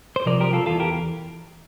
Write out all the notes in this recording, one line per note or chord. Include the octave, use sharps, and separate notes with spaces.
C5
C2 C3 F3 A#4 D5
G4 A#4
F4 A4
E2 E3 F4 A4
G4 A#4